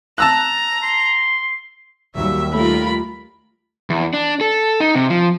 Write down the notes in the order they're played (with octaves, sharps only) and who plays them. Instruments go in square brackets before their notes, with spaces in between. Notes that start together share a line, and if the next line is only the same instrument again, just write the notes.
[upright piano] A5 E6 F#6 [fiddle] A#5
[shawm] C6
[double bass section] D#2 G3 [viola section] F#3 E5
[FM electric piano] A3 [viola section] F4 A#4 [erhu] B5
[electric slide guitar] E2
D4
A4
D#4
C3
F3